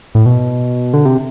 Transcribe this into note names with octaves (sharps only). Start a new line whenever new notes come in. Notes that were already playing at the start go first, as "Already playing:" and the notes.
A2
B2
D3
C3